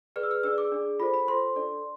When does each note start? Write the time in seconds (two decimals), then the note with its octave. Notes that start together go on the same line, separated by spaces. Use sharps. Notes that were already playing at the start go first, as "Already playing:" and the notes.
0.16 G#4 B4 D5 F6
0.23 E6
0.31 F6
0.43 D4 G#4 D5 E6
0.58 D6
0.72 D4 G#4 D5
0.99 F4 A4 C5 B5
1.14 B5
1.28 F4 A4 C5 C6
1.56 D4 A4 D5